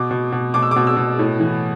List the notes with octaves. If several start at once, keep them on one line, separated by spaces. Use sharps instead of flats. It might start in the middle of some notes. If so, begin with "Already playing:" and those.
Already playing: B2 D6
B2
B2
B2 D6
E6
B2 D6
E6
B2
A2
E3